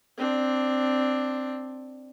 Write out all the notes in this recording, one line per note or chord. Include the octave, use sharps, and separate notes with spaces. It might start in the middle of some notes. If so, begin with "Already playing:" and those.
C4 D4